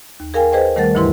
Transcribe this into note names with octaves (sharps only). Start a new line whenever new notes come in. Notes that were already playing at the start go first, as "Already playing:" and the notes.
D#2
G#4 A#4 F5 G5 G#5
G#4 B4 C5 D#5 G5
D#3 G3 A3 A#4 F#5 A6
D2 G2 E3 E4 B4 C6